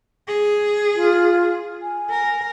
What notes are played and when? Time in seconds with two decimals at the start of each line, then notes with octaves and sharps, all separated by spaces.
0.27 G#4
0.95 F4
1.82 G#5
2.10 A#4